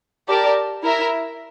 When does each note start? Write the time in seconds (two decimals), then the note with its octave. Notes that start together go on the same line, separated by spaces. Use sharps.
0.27 G4 A#4 D5 A5
0.83 E4 A#4 E5